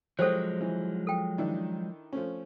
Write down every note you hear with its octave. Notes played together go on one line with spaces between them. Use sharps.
F3 F#3 G#3 G4 A4 C5 C#5 G5
E3
A4 G5
D#3 D4 E4
F3 A3 C#4